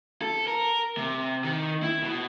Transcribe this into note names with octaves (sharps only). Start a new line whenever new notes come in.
A4
A#4
C3
D#3
E4
B2